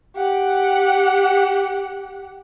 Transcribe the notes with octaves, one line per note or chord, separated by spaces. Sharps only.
G4 F#5